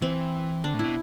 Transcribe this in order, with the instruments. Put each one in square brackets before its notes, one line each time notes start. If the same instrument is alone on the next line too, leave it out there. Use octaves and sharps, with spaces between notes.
[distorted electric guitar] E3 [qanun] C4
[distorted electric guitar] D3 [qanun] D4
[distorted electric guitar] A2
[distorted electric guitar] B2 [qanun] E4